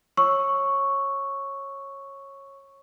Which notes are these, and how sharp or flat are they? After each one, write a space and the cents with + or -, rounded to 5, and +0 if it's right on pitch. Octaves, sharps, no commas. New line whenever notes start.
C#5 -20 C#6 +0 E6 +0